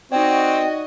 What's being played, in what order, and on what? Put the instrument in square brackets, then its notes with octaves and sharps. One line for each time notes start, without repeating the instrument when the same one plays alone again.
[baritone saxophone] C4 [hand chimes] D#4 D5 [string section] F#4 D#5 [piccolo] G5